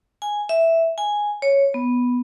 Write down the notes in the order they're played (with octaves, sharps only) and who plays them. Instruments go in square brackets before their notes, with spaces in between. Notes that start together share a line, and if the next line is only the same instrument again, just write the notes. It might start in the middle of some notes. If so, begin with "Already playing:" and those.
[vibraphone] G#5
E5
G#5
C#5
B3